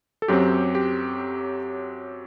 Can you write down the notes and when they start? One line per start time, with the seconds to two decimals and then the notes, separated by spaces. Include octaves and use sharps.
0.22 A4
0.28 F#2 F#3 C4 G4
0.75 G4